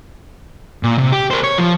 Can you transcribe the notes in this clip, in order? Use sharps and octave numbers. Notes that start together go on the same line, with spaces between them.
A#2
C3
G4
A#4 C5
C#5
F3